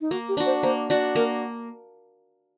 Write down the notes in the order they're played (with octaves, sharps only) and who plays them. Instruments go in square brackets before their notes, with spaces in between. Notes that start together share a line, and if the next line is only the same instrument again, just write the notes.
[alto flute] D#4
[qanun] A#3 [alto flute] F#4
[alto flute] G4
[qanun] D4 F#4
[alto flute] C5
[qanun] A#3 [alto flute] C5
[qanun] D4 F#4 [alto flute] D5
[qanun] A#3 [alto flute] A#4